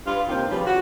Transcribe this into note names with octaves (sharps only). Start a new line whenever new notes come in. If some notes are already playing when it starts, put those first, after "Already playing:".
G2 F4 B4
D#2 C3 A#3 F4 G4 C5
F3 G3 C#4 G#4 B4
F#4